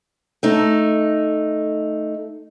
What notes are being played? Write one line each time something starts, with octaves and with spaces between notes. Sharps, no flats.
A3 D#4